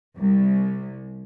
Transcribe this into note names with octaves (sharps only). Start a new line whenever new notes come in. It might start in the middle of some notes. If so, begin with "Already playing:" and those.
C2